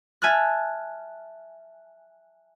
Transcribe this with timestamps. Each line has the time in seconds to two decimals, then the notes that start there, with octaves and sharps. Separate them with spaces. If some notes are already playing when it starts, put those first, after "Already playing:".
0.22 E5 G#5 A5 F6 F#6